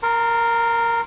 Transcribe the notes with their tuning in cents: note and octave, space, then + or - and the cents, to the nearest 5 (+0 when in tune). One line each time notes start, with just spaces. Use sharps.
A#4 +0 A5 +45 C6 +0